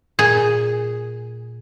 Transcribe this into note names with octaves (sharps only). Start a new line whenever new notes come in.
A#2 G#4